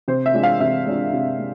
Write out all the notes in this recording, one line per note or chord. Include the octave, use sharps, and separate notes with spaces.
C3 C5
E5
G#3 D4 F4
F5
C3 E5
G#3 D4 F4
C3
G#3